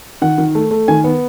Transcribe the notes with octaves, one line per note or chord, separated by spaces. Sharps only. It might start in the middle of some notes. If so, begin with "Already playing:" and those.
D#3 F#5
D#3
A3
A3
D#3 G#5
B3